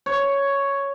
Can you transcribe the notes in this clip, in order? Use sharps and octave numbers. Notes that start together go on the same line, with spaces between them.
C#5